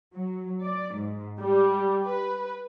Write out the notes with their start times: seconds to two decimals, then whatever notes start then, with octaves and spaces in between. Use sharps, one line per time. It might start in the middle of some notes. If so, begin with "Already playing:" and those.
0.14 F#3
0.63 D5
0.96 G#2
1.40 G3
2.05 B4